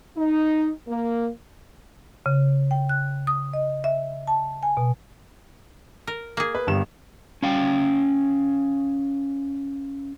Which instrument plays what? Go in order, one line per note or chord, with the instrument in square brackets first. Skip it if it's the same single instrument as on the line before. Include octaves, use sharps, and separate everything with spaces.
[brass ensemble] D#4
A#3
[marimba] C#3
G5
F#6
D#6
D#5
E5
A5
G#5
B2
[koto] A#4
A#3 G#4
[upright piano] B4
G1 G2 E7
[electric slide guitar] C#4 F5 G5